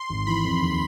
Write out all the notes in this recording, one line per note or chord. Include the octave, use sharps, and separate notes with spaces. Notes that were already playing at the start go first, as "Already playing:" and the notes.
Already playing: C6
G#1
E3 B5
F2
D#2